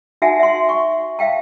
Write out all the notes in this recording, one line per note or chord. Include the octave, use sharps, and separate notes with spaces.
D#4 F#4 E5 F#5 G#5 A5
E5 C6
C#6
E5 F5 G5 A5